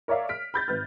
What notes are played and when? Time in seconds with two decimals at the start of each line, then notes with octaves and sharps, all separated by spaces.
0.08 A#4 C#5 D5 E5 F5
0.29 F6 B6 D7
0.54 B5 G6 A6
0.68 G#1 B4 F6